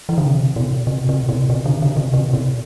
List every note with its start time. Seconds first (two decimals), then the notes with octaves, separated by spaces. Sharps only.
0.09 E3
0.18 D3
0.25 C3
0.56 B2
0.87 C3
1.09 C3
1.29 B2
1.50 C3
1.66 D3
1.82 D3
1.97 C3
2.13 C3
2.33 B2